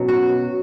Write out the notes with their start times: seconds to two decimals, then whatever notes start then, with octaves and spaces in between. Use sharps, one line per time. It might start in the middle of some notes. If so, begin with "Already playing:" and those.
Already playing: B2 F#3 C#4
0.08 F#4